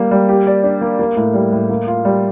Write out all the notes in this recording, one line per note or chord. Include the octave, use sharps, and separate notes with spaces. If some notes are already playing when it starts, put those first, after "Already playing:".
Already playing: G3 A#3
G3
G4
D5
D4
A#3
A#3
A2
G3
A2
A#3
F4
G3